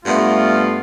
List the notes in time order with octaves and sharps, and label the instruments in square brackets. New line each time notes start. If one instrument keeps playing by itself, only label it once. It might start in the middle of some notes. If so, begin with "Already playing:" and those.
[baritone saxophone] G2 [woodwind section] A3 B3 F4